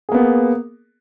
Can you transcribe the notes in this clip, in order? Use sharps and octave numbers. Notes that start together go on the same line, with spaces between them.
A#3 B3 G#4